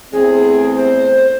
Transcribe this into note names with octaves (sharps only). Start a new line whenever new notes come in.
E2 A3 C4 G#4
C5